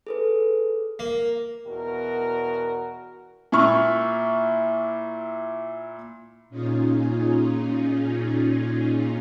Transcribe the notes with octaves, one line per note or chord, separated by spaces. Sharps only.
G#4 A4 B4
A#3
E2 B2 F#4 A#4
A#2 E4 B5 C#6 F6
A#2 C#4 D#4 F4 G#4